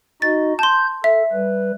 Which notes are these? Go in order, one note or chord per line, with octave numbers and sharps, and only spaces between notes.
D#4 F#4 D#5 A6
A5 C6 G6
A4 E5
G3 B4